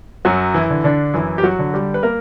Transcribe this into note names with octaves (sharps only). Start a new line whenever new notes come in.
F#2 F#3 F#4
E3 E4
D3
D3 D4
F#2 E3 E4
G4
F#3 F#4
D3
G3 G4
B4
A#3 A#4